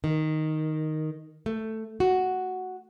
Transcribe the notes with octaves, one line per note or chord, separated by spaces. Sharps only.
D#3
A3
F#4